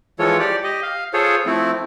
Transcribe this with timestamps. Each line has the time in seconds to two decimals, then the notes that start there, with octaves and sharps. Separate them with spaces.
0.19 E3 F3 G#3 F4 A4 C#5
0.39 G4 D5
0.64 G4 D#5
0.83 F5
1.13 F4 G#4 A4 C5 C#5
1.46 F3 A3 C4 E4